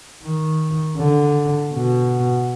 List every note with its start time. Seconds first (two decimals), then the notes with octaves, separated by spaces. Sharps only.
0.23 D#3
0.97 D3
1.73 B2